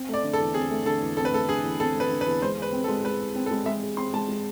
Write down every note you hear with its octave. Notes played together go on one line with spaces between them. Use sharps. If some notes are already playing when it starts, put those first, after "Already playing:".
Already playing: C4
A3 D5
D3
A4
E2
C4 G#4
A3
D3 A4
E2
C4 A4
B4
A3 A4
D3 G#4
E2
C4 A4
A3
B4
D3
B4
E2
G#3 C5
G#4 B4
C4
A4
G#3
G#3 B4
G#4
C4
A4
G#3
G#3 E5
G#4
C4 C6
G#3 A5
G#3